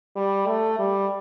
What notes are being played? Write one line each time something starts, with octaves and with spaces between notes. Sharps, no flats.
G3
A3
G3